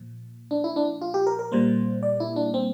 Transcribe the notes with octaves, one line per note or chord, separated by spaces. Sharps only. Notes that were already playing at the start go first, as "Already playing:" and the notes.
Already playing: A#2 F3
D4
E4
D4
F4
G4
A#4
A#4
A#2 G3 A#3 C5
D5
E4
D4
C4